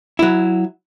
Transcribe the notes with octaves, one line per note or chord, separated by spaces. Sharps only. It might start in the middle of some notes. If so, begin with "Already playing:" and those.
F#3 E4